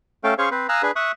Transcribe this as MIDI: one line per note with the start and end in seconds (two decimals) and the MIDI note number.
0.24 0.34 57
0.24 0.34 61
0.24 0.34 69
0.24 0.34 77
0.24 0.34 79
0.38 0.49 61
0.38 0.49 68
0.38 0.49 72
0.38 0.49 73
0.38 0.49 77
0.38 0.49 85
0.51 0.67 60
0.51 0.67 71
0.51 0.67 72
0.69 0.82 77
0.69 0.82 80
0.69 0.82 82
0.69 0.82 87
0.69 0.82 88
0.69 0.82 90
0.83 0.91 62
0.83 0.91 68
0.83 0.91 71
0.96 1.12 76
0.96 1.12 85
0.96 1.12 87
0.96 1.12 90